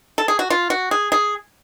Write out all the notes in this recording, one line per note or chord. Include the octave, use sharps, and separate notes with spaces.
A4
G#4
F#4
F4
F#4
G#4
G#4